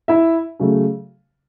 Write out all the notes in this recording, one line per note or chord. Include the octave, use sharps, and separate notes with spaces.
E4 E5
C#3 F#3 A3